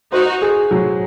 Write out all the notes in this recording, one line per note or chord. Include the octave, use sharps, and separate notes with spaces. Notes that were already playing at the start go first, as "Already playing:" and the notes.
D#4 F#4 C5
G#4
F#3